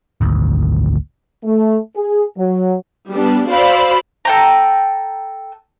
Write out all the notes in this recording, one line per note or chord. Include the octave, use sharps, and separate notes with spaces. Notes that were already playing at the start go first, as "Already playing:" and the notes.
G#1 D2
A3
G#4
F#3
G3 B3 D4
F#4 C5 D5 F5 B5 E6
A4 G5 A#5